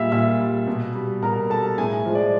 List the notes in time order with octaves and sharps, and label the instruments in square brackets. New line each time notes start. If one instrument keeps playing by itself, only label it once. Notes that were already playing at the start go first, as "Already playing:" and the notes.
Already playing: [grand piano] A#2 G3 E5 F5 E6
A#2 E5 E6
G3
B2
G3
B2 A#4 A#5
G3 A4 A5
A2 G#4 G#5
F3 G#3
D5